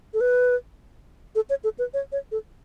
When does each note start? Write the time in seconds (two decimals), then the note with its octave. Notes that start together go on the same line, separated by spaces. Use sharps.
0.14 A4
0.21 B4
1.35 A4
1.50 C#5
1.64 A4
1.79 B4
1.94 C#5
2.12 C#5
2.32 A4